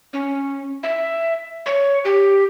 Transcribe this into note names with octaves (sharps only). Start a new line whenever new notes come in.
C#4
E5
C#5
G4